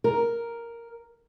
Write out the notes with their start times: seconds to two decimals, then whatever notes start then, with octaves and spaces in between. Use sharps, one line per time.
0.04 A#4